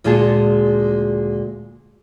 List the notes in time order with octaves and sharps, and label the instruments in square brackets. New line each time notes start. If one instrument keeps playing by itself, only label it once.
[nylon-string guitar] D2 A#2 G#3 F4 G#4 A5